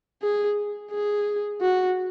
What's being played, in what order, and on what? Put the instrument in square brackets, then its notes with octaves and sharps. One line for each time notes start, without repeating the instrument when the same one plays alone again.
[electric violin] G#4
G#4
F#4